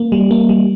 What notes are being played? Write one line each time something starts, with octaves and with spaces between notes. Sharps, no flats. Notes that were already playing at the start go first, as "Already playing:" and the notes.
Already playing: A#3
G3
A#3
G3